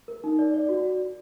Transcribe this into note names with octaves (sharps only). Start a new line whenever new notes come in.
A#4
D#4
D5
D5
F#4